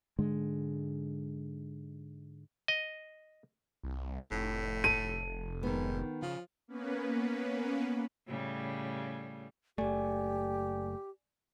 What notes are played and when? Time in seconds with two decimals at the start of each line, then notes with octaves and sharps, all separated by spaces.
0.19 G#2 D3 G#3
2.68 D#5
3.83 C2
4.31 F1 A2
4.84 A4 D#7
5.63 G#2 D#3 B3
6.22 C#3 F3
6.68 A#3 B3 C#4 B4
8.28 A2 C#3 G3
9.78 F#1 A3 G4 D5 G#5